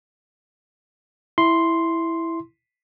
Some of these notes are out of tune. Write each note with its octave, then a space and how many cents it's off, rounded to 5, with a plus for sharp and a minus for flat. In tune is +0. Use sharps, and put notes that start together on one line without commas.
E4 +0 C6 +0